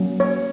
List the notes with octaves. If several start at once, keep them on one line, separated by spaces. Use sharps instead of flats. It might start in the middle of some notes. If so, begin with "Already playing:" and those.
Already playing: F#3 A#3 C#4
C#5